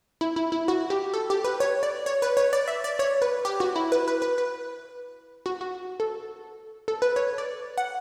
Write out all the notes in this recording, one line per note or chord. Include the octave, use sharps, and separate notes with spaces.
E4
E4
E4
F#4
G4
A4
G4
B4
C#5
D5
C#5
B4
C#5
D5
E5
D5
C#5
B4
G4
F#4
E4
B4
B4
B4
B4
F#4
F#4
A4
A4
B4
C#5
D5
F#5